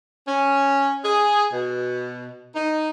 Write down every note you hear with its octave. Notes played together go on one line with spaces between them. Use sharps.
C#4
G#4
B2
D#4